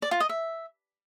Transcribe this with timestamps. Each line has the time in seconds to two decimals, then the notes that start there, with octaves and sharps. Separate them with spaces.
0.02 D5
0.11 F4
0.20 D#5
0.29 E5